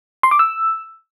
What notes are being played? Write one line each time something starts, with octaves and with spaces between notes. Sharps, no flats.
C6
D6
E6